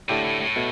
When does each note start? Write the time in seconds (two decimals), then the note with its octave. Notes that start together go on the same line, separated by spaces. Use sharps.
0.09 A2 D3 A3 E4 G4
0.24 A2
0.41 A2
0.56 B2 A3